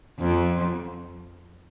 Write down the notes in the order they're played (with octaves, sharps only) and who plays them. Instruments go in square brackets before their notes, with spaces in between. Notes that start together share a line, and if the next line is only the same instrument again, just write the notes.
[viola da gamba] F2